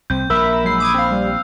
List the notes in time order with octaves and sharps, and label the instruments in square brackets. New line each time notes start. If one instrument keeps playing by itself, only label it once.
[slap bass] C2 [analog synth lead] C4 [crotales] G6
[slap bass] A#1 [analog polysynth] A#4 E5 [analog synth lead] B5 [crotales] E6
[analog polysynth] F#3 G#3 C7
D6 D#6 G#6
C4 F5
[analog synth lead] G3